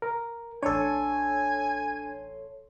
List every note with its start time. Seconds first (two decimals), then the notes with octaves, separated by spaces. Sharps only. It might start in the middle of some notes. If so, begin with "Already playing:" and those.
0.02 A#4
0.63 A1 D4 A4 C#5 G#5 C6